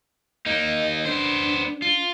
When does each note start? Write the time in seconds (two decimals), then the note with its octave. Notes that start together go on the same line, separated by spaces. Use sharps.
0.46 A#3 D#4 D#5
0.61 D#5
1.05 B3 D4 C5
1.82 F4